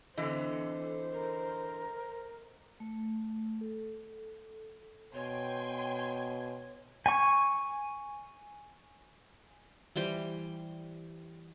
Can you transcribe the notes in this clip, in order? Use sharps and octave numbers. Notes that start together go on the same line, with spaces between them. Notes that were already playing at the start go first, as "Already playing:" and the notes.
D3 E3 A4 C5 D#5
A#4
A3
A4
B2 C#5 G5 G#5 C6
G#5 C#6
E3 G3 C5 G5